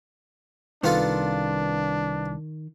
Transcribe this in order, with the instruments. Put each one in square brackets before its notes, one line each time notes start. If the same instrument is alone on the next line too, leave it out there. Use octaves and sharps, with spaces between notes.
[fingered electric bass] C2 [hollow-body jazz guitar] D#3 [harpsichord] B3 F4 A4 [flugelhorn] D4